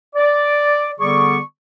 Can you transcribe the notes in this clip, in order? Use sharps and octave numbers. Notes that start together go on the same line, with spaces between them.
D5
D3 G3 B3 G#4 D5 C#6